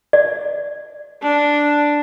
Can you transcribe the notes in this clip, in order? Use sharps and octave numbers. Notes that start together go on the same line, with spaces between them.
D5
D4